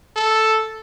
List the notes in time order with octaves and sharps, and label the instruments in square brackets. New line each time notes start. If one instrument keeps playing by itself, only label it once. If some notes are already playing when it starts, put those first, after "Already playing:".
[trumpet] A4